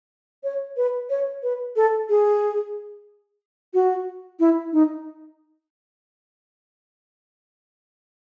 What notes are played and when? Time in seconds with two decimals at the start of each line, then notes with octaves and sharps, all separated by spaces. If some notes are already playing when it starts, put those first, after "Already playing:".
0.44 C#5
0.77 B4
1.10 C#5
1.43 B4
1.76 A4
2.09 G#4
3.74 F#4
4.40 E4
4.73 D#4